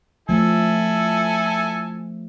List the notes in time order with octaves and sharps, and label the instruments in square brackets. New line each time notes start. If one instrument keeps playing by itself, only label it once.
[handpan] F3 A3 [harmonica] E4 A4 G#5